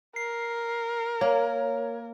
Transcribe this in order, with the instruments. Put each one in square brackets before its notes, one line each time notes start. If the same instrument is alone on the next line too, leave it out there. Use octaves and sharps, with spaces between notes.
[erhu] A#4 [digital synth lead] C7
[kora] A#3 [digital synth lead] C#5